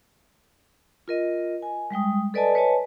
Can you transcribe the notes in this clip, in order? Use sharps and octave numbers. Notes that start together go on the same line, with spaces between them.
F4 A#4 D#5
G#5
G3 G#3 G5 D#6
A4 B4 D5 D#5 G#5 A5
B4 C#5 D#5 G#5 A5